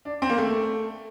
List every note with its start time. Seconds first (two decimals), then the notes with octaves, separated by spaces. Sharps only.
0.05 D4
0.22 C4
0.30 A#3
0.38 A3